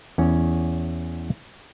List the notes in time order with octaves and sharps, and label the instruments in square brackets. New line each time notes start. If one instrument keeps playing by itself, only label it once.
[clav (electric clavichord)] E2 C#4 C#5